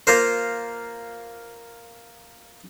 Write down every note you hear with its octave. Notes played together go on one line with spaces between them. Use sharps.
A#3 F4 A#4 C5